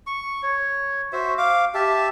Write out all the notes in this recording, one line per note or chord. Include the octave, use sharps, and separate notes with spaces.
C#6
C#5
F#4 C5 E5
F5 D6
G4 E5 A5